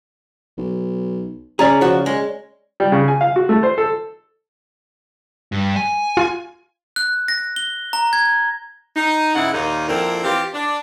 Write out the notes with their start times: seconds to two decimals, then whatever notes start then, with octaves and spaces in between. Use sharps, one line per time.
0.58 B1
1.59 C#3 C#4 G#4 D5 A#5
1.81 F3 F#4
2.06 G#3
2.80 G3
2.92 C#3
3.08 G#5
3.21 F5
3.36 F#4
3.49 A3
3.63 C5
3.78 A4
5.52 G2
5.76 G#5
6.17 F4
6.96 F#6
7.28 A#6
7.56 G7
7.93 A#5
8.13 G#6
8.96 D#4
9.35 G2 C#3 G#3 E4 F#5
9.53 D#2 A#2 D#4
9.88 F2 A#2 D3 C4 E4 A#4
10.24 E3 C4 F4 G4
10.54 D4